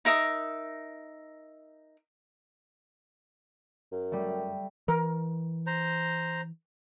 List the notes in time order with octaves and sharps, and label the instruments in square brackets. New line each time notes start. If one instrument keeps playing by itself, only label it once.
[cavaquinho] D#4 A#4 E5 D#6
[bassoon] F#2
[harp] G3 A3
[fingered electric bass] E3 [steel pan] A#4
[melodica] C5 A#5